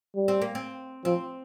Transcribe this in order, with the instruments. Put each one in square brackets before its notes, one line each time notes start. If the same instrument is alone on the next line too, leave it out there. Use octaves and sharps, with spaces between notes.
[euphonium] G3
[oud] C4
A#3
C4
[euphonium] F3 [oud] C4